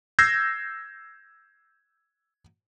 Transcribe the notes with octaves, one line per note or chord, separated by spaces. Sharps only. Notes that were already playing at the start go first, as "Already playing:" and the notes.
E6 G6 G#6 A#6 C7